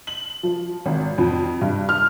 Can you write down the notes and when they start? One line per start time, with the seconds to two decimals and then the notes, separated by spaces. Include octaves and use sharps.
0.07 F#7
0.43 F3
0.86 G#1
1.18 F2
1.61 G2
1.89 F6